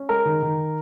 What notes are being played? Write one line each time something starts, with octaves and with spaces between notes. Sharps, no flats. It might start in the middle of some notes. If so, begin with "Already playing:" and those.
Already playing: C#4
G#3 A#4
D#3
D#3